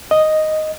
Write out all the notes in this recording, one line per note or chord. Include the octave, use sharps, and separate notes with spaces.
D#5